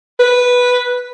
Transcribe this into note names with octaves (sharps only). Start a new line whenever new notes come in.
B4